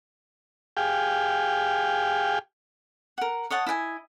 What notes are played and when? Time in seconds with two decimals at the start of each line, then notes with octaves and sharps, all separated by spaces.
0.77 G4 G#4 F5 G5
3.18 A#4 F#5
3.50 C#5 D#5 F#5 A5
3.66 E4 D#5 G5 G#5